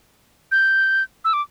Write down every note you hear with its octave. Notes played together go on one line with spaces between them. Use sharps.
G6
E6
D6